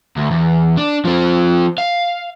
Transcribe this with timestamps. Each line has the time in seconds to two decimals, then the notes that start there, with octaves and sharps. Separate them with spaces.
0.17 D2
0.31 E2
0.77 D4
1.05 F3 C4
1.78 F5